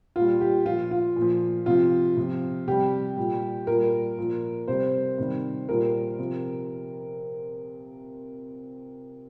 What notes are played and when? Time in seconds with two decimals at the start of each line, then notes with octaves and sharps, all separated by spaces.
0.16 A#2 G3 F4
0.41 G4
0.66 A#2 F3 F4
0.91 F4
1.16 A#2
1.22 F3
1.66 C3 F3 F4
2.17 C3 F3
2.67 C3 G3 G4
3.17 A#2 G3
3.67 A#2 G3 A#4
4.18 A#2 F3
4.68 C3 G3 C5
5.18 C3 D#3 G3
5.69 A#2 G3 A#4
6.18 C3 F3